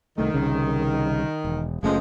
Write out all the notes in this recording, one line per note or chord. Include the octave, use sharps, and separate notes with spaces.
C2 D#3 A3
C2 C#3
E1
F#1 F3 G#3 A3 C#4